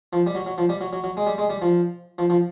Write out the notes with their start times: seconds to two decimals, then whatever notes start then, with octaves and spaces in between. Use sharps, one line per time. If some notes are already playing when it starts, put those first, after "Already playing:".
0.13 F3
0.27 G3
0.35 F#3
0.46 F#3
0.58 F3
0.69 G3
0.81 F#3
0.93 F#3
1.04 F#3
1.17 G#3
1.27 G3
1.38 G#3
1.50 G3
1.62 F3
2.18 F3
2.30 F3